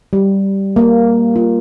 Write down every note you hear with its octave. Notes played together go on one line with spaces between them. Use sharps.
G3
A#3
F4